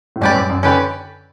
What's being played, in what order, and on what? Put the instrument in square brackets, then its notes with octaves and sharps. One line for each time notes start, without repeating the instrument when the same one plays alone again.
[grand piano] A2
[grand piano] G2 [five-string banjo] C#4 G4 B4 D5
[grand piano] F#2
F#2
[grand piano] D3 [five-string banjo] C#4 G4 B4 D5